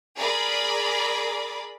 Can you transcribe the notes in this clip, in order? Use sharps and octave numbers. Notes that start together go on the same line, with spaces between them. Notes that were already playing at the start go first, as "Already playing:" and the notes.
G#4 A#4 D5 B5